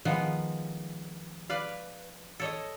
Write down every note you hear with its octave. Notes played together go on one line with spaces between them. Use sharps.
D#3 F3 G#3 B3
B4 D5 F5
A4 C#5 D#5